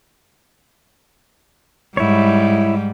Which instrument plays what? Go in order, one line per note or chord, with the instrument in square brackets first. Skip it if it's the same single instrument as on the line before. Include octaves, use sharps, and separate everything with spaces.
[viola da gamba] G#2 G3 [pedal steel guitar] E4 C#5